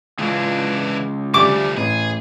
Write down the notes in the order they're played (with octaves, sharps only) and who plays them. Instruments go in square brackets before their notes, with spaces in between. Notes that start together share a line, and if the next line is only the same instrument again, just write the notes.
[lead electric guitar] C#2 [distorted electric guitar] E3 D4
[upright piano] D2 G3 [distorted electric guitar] F3 A3 [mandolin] D6
[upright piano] A1 [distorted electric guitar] G#4